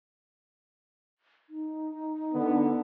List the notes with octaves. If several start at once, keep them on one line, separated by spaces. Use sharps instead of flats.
D#4
D3 B3